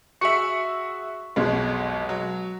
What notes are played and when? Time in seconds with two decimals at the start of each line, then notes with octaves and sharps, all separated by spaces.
0.21 F#4 G#4 E5 C#6 C#7 F#7
1.36 F1 B1 B2 G#3
2.09 F#3